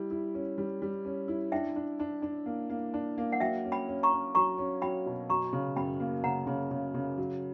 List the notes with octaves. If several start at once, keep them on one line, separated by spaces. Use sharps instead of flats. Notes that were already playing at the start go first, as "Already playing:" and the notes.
Already playing: G3 E4
E4
C#4
G3
G3
C#4
E4
D4 E5 G5
D4
D4
D4
A#3
A#3
D4
A#3
F#5
F#3 E5 G5
C#4
G5 B5
C#4
A#5 C#6
C#4
F#3 A#5 C#6
C#4
F#3 G5 B5
B2
F#3 A#5 C#6
C#3
F#2 G5 B5
A#3
C#3 F#5 A#5
C#3
C#3
C#3
F#3